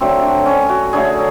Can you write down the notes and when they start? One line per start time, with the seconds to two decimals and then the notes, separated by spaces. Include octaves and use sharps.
0.01 D3 F#3 A3 C4
0.23 D4
0.46 C#4
0.69 F#4
0.93 D3 F#3 A3 G#4